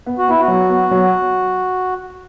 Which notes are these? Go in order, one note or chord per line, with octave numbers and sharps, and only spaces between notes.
B3
F#4
B3 E4
F#4
F#3
B3
F#3